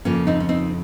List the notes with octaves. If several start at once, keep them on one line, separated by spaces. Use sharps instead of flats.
F2 C#3 F3 A#3 C#4
C4 D#4
C#4
C4 D#4